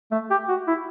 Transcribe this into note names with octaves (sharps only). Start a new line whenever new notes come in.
A3
G4
F#4
E4